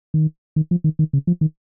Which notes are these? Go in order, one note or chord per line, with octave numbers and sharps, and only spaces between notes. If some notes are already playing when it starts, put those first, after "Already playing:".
D#3
D#3
F3
D#3
D#3
C#3
F3
D#3